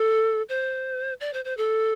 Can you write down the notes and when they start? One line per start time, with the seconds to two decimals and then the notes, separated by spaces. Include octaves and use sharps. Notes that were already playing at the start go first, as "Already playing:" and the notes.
Already playing: A4
0.49 C5
1.20 D5
1.33 C5
1.45 C5
1.57 A4